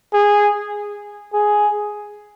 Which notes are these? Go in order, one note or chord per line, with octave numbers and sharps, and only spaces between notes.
G#4
G#4